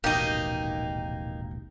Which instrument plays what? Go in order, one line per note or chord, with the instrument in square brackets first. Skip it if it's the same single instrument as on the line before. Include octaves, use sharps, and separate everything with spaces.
[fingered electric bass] D#1 A1 B2 [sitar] A#3 D#4 [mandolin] G4 D#5